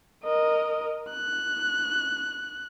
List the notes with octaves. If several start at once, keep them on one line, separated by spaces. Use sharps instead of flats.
A#4 D#5
F#6